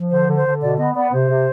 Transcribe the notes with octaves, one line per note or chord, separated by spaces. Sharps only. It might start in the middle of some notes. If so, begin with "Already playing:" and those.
Already playing: F3
D3 C5
D3
C5
D3
B2 D5
B3 D#5
B3 D5
C3 C5
C3